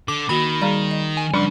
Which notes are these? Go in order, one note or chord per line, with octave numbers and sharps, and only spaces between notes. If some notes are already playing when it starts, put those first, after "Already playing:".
D3 D6
D#3 A#3 F#4 B5
G3 G#4 F5 A#5
D#5
G#5
C#3 F3 G3 C#4 D4 F#5